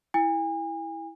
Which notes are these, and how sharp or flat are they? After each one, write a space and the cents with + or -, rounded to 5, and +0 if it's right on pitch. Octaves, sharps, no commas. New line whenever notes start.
E4 -5 G#5 -40